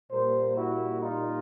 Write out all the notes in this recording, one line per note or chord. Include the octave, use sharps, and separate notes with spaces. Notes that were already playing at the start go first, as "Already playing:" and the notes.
A#2 G3 A#3 A#4 C5
E4 F#4
D#4 F4